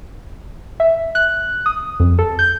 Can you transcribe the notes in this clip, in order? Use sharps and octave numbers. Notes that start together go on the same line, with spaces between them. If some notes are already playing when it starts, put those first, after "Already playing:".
E5
F#6
D#6
F2
A4
G6